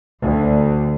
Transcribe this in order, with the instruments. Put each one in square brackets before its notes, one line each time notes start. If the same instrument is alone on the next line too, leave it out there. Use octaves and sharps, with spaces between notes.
[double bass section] D2